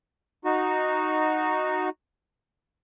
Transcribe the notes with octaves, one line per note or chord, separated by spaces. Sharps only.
D#4 F#4